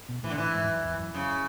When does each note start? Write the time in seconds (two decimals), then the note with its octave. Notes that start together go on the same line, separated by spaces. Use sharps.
0.09 B2
0.23 A2 E3
0.30 D3
0.38 A2 E3
0.54 G#2
0.63 E2
0.68 F#2
0.84 E2
0.99 F#2
1.14 F#2 C#3